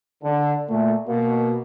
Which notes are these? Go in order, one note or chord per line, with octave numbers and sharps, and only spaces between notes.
D3
A#2 A3
B2 A#3